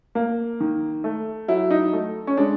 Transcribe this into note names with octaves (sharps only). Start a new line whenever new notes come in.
A#3
D#3
A3
F#3 E4
D#4
A3
C#4
G#3 D4